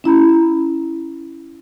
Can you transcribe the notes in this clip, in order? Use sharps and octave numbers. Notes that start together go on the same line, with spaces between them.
C#4 E4 A#5 B5